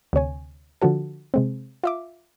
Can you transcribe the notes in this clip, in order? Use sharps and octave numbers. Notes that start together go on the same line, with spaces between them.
D2 C3 C#5 G#5
D3 F3 F#4 A4
C3 G#3 C4
F4 E5 D6